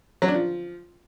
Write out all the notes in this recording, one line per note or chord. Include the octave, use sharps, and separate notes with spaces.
F#3
D4
F3